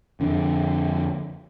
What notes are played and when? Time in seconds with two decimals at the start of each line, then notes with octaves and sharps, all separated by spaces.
0.20 F2 D3